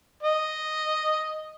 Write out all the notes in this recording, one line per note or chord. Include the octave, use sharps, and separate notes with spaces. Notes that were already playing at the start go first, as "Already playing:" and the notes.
D#5